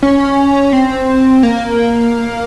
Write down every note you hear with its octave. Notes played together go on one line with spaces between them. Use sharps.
C#4
C4
A#3